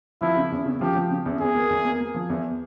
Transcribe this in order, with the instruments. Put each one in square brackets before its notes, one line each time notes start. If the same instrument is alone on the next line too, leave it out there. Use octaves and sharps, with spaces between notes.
[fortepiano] F3 [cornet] E4
[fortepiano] C#3
E2
C#3
[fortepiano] F3 [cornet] G4
[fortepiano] F3
C#3
E2
[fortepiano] E2 [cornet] G#4
[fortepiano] A#3
E2
A#3
A#3
F3
E2